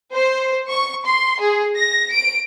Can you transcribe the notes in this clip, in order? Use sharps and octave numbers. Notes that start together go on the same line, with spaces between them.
C5
C#6
C6
G#4
A#6
D7